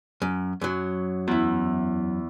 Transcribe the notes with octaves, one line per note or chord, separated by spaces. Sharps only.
F#2
F#2 F#3
E2 E4